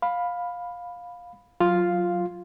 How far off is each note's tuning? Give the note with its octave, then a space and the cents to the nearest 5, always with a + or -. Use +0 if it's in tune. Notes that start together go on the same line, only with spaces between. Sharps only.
F5 +15 B5 +0
F#3 -10 F4 +0 F5 +0